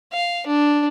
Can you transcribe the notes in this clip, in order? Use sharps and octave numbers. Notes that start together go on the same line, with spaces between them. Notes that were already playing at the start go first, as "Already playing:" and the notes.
F5
D4